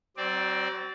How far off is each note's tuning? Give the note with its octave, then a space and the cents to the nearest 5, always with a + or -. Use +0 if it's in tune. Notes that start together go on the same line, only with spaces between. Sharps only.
F#3 +40 C4 +0 D5 +0